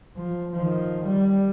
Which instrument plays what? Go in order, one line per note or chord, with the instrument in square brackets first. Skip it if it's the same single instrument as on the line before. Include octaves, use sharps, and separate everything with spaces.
[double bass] F3
D#3 F3
G3